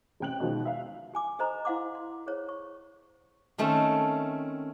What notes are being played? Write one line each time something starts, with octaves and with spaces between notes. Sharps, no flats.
A1 C3 G5 F#6 F#7
B2 D#3 F3 G#3
E5 F5
G4 G#5 D6
G4 A4 C5 D#5 A#5 B5
E4 C5 F5 F#5 C6 D6
C6
G#4 C5 C#5
C#6
D#3 A3 C4 C#4